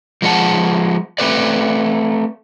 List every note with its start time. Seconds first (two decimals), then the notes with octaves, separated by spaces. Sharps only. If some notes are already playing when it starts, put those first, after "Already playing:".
0.22 F3 G#3 D4 F#5 A5
1.18 A3 C4 G4 B4 D5